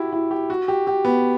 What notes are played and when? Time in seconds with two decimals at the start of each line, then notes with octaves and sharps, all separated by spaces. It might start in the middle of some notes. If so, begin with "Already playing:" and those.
Already playing: E4 F#4 G4
0.13 E4
0.31 G4
0.50 F#4
0.68 G4
0.87 G4
1.05 B3